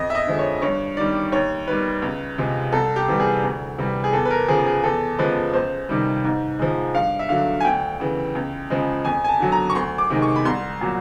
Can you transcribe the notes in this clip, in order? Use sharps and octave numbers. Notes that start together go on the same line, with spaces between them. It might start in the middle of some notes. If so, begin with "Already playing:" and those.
Already playing: F2 D#5
E5
D#5
D3 F3 G#3
C#5
G2 C#5
D#3 G3 D5
D#2 C#5
D#3 G3 B4
C#2
C3 F3 G#3
C2 A4
G4
C3 E3 G3
G#4
D2
C3 E3 G3
G#4
E2 A4
B4
A#4
C#3 F3 G#4
G#4
E2 A4
C#3 F3 G#3 B4
C#2 C5
C3 D#3 G3
G#2
F3 G#3
G2 F5
E5
D3 F#3 F5
G#5
D2 G5
C#3 E3
C#2
C#3 F3 G#3
F2 G#5
G#5
A5
D3 F#3
A#5
C#6
D2 C6
D6
C3 D#3 G#3
C#6
B5
C2 C6
A#2 F#3